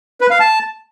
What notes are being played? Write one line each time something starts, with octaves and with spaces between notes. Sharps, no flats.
B4
F5
A5